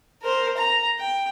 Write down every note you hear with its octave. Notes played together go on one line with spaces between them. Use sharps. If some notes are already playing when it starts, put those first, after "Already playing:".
A#4 C5
A#5
G5